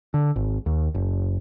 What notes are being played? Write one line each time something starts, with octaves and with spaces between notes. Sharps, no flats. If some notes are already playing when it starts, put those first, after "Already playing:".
D3
G#1
D#2
F#1